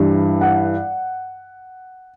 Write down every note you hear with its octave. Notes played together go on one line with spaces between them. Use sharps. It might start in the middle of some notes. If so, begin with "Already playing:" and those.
Already playing: G2 E3 G3
F#5